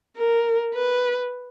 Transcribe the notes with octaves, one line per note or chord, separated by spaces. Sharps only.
A#4
B4